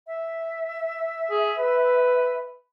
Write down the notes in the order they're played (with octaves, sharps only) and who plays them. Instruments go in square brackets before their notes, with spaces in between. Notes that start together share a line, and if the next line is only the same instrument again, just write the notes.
[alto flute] E5
[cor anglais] G#4
B4